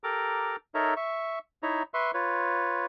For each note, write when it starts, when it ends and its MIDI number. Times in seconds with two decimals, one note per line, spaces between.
0.04 0.56 67
0.04 0.56 69
0.04 0.56 70
0.04 0.56 82
0.04 0.56 86
0.75 0.94 63
0.75 0.94 69
0.75 0.94 70
0.75 0.94 73
0.75 0.94 76
0.75 0.94 82
0.96 1.39 76
0.96 1.39 85
1.63 1.83 63
1.63 1.83 64
1.63 1.83 73
1.63 1.83 76
1.63 1.83 82
1.94 2.11 71
1.94 2.11 76
1.94 2.11 84
1.94 2.11 85
2.14 2.86 65
2.14 2.86 71
2.14 2.86 73